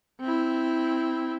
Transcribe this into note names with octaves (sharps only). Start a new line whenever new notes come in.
C4 E4